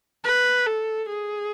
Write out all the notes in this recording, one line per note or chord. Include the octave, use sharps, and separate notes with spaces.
B4
A4
G#4